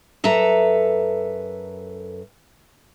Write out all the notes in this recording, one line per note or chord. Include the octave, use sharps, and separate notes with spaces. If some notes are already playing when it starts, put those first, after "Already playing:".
F#2 A4 B4 E5 A#5